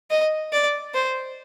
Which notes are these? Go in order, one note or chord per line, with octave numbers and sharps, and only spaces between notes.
D#5
D5
C5